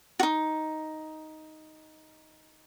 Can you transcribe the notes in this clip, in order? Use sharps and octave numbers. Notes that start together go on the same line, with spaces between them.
D#4 F#4